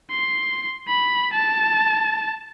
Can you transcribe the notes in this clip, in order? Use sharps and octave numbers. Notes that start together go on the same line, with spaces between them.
C6
B5
A5